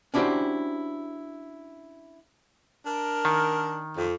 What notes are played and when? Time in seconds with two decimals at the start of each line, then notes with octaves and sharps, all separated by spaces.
0.14 C#4 D4 E4 F#4 G4 C5
2.86 D4 A#4
3.25 D#3
3.97 F2